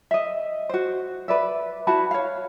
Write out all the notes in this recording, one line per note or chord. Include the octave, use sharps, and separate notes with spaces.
D#5 E5
F#4 C5
B4 D5 E5
E4 F#4 A5 B5
C#5 F5